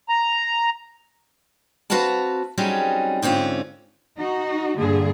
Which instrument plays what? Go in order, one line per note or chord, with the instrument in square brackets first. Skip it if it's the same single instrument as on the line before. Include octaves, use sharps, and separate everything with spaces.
[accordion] A#5
[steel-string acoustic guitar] C4 F#4 B4 F5 F#5 A5
F#3 G3 C4 C#4 D#4 G#4
G#2 D3 C4 C#4 F4
[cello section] D#4 F#4
G2 A#2 D3 G#4